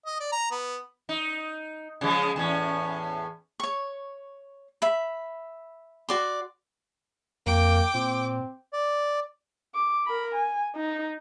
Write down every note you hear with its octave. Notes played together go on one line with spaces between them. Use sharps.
D#5
D5
A#5
B3
D#4
C#3 F3 G#3
E2 A2 C#4
C#5 C#6
E5 B5
F#4 D5 C6
F2 A#3 G5 D6
A#2 C4
D5
D6
A#4 B5
G#5
D#4